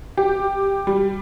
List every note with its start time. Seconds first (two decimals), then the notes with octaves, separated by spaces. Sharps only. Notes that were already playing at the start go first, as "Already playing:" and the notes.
0.17 G4
0.87 G3